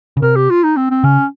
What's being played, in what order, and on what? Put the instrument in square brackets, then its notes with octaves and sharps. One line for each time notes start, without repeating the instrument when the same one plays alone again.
[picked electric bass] C#3
[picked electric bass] C3 [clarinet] A#4
[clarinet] G4
F4
D#4
C4
C4
[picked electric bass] C#3 [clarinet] C#4